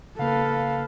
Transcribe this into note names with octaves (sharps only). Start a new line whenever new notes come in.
C#3 A#3 A4 B4 F5